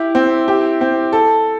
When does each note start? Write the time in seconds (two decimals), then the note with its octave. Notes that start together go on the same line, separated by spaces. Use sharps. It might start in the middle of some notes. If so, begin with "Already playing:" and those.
Already playing: E4 G4
0.15 C4
0.48 G4
0.81 C4
1.13 A4